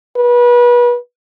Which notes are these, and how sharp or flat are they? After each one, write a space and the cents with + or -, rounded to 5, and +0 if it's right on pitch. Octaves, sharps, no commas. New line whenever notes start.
B4 -30